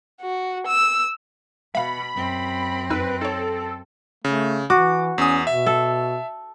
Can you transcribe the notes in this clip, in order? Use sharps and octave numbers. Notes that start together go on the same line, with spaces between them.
F#4
E6
B2 E5 F5 B5
F#2 C4
F2 D#4 B4 E6
D#4 A4 C#5
C#3 A3
E3 F#4 D6
E2 C#4 D#6
B2 E5
A4